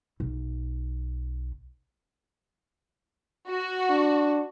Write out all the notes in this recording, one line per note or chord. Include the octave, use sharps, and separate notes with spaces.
B1
F#4
D4